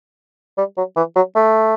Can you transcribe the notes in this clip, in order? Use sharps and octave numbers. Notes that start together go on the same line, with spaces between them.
G3
F#3
E3
F#3
A3